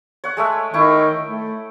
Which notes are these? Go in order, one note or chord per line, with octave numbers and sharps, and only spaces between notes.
C#5 F#5
G#3 A3 E5
D#3 E4 G5 C#6
A3